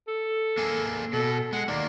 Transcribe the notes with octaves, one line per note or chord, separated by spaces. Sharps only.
A4
A#3 G#4
B2 A4
G#3 F#5
D#3 A#3 D5